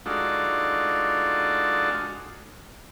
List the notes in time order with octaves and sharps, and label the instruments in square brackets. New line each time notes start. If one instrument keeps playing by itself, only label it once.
[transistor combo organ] G#3 D4 D#4 F4 F#4 A4